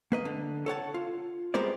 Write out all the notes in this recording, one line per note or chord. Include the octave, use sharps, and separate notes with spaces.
A#3 B4 D#5
D3
A4 C#5 F#5 A5
F4
G3 G#3 B3 A#4 C5 D5